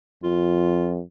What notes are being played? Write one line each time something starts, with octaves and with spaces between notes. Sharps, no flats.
F2 F4